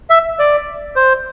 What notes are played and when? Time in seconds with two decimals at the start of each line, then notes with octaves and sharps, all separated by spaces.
0.10 E5
0.39 D5
0.96 C5